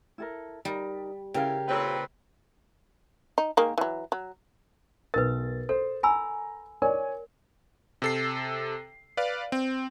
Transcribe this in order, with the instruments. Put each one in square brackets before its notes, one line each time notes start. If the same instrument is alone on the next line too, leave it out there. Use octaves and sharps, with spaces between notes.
[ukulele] E4 A4 A#4
[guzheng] G3 [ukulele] D#4 A#4
[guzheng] C#3 [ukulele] E4 [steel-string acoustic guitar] G4 A#4 F5
[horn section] A#2 C4 B4 [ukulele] A4 C#5 G5
[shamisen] D#4
D#3 G#3 A#3
E3 F#3
F#3
[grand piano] B1 A6 [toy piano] A#4 B4
[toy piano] A4 [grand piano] C5
[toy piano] G#5 B5 E6 [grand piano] A#5
[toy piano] A#4 [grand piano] C#5 D5 G#5
[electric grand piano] C3 A4 C7
B4 D5 F5
C4